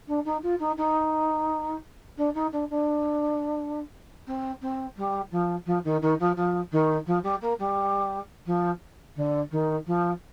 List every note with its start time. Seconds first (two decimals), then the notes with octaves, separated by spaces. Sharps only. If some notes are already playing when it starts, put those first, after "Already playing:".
0.08 D4
0.25 D#4
0.43 F4
0.60 D#4
0.77 D#4
2.18 D4
2.35 D#4
2.52 D4
2.70 D4
4.27 C4
4.62 C4
4.97 G3
5.31 F3
5.66 F3
5.85 D#3
6.02 D#3
6.20 F3
6.36 F3
6.72 D#3
7.07 F3
7.23 G3
7.41 A#3
7.59 G3
8.46 F3
9.16 D3
9.51 D#3
9.87 F3